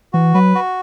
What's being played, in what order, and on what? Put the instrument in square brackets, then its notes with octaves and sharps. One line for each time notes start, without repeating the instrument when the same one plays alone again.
[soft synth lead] E3 [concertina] F#4
[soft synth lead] F#3 [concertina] B4
[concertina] F#4